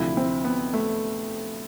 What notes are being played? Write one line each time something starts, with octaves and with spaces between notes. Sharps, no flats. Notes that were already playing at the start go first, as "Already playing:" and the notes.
Already playing: D2 C3 F3 E4
C4
B3
A3